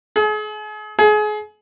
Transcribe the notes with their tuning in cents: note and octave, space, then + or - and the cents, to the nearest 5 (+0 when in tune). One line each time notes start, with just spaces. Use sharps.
G#4 +40
G#4 +30